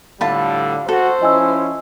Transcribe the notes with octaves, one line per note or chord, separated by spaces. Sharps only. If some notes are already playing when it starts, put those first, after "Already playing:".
A2 D3 G3 F4 A5 B5
F#4 A4 C5
F3 C#4 E4 D#5 G#5 E6